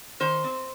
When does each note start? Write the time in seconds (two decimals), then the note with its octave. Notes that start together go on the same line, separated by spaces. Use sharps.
0.20 D#3 C5
0.44 C4